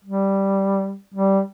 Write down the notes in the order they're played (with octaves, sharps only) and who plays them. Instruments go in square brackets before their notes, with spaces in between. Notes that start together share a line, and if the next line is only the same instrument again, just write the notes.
[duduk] G3
G3